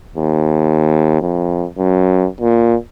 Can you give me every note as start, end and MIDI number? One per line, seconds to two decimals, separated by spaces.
0.17 1.19 39
1.21 1.66 41
1.78 2.27 42
2.41 2.75 46